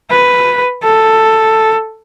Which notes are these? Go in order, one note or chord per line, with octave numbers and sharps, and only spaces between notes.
B4
A4